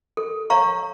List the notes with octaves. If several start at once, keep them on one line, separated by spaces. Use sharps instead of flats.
A4
C#5 F5 A#5 C#6